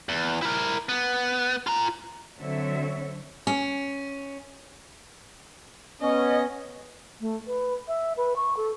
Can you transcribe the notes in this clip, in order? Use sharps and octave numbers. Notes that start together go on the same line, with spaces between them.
E2
E4 A#4
B3
F4 A#5
D3 F#3 C4 A4 C#5 E5
C#4
B3 C#4 D#5
A3
B4
E5
B4
C#6
A4